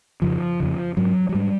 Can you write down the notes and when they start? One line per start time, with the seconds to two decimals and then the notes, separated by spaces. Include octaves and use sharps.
0.22 F2 C#3 F3
0.60 F2 C#3
0.97 G#2 F#3
1.29 F#3
1.34 G#2 G3